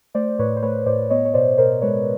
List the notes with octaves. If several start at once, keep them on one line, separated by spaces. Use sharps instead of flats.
A3 C5 D5
A2 B4 C#5
C5
A3 B4 C#5
A2 C5 D5
B3 C#5 D#5
C#5
B2 C5 D5
B2 A#4 C5
G#3 B4 C#5